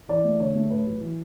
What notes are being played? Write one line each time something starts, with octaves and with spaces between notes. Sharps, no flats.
E3 D5
A3
D3 C#5
A3
A2 B4
F#3
E3